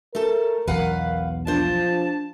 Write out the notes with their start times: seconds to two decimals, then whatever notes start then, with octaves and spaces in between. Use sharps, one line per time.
0.15 A3 A4 A#4
0.67 B1 E2 B4 F5 F#5
1.47 F3 D4 C5 A5